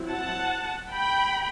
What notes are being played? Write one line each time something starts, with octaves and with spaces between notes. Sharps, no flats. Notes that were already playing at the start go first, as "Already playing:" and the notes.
Already playing: F#3 C4 E4
F#5 A5
G5 B5